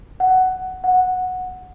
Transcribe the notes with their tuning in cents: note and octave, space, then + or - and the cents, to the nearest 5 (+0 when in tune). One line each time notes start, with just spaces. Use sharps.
F#5 +10
F#5 -10